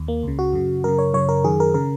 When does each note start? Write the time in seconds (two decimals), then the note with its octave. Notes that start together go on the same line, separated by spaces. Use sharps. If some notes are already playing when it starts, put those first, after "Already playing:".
Already playing: D#2
0.08 A#3
0.23 C#2 C#3
0.39 F#4
0.53 F#2 C#3
0.84 F#2 C#3 A#4
0.99 C#5
1.14 F#2 C#3 C#5
1.29 A#4
1.44 F#2 D#3 G#4
1.60 A#4
1.74 C#3 A#4